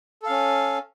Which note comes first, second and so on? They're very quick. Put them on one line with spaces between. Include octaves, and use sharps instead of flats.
A4 F5 C#4